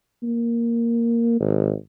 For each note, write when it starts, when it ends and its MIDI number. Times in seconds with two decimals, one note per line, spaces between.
0.23 1.39 58
1.40 1.73 32